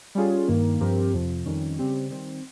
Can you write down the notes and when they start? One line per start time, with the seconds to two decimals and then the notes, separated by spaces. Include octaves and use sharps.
0.15 G3 C#4 F4 G#4
0.48 G2 D#3 A#3
0.80 G2 F3 C4 G4 A#4
1.13 F2 C3 F3
1.45 F2 D#3 G3 C#4
1.79 C#3 G3 C4 G4
2.11 D#3 G3 C4